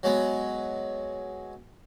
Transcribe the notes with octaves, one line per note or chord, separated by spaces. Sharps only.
F#3 G#3 B3